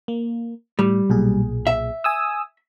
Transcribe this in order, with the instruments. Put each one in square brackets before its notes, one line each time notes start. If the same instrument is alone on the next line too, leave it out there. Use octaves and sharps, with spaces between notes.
[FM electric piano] A#3
[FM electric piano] A2 [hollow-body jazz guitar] G3
[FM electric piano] B1 A#2 G#4
[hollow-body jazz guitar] E5
[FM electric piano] G#5 D#6 E6